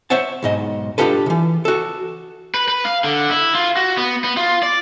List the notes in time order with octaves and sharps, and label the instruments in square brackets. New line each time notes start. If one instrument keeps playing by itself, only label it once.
[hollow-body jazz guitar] C5 C#5 E5 F#5 A5
B1 G#2 D#5
D4 F4 G4 A4 B4
C#3 E3
F#4 A4
[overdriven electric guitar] B4
B4
F5
D3
E4
F4
F#4
B3
B3
F4
D5